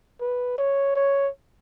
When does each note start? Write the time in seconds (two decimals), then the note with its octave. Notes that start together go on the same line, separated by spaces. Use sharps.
0.21 B4
0.58 C#5
0.96 C#5